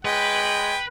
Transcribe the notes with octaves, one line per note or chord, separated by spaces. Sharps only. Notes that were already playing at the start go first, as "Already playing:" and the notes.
G#3 B4 G5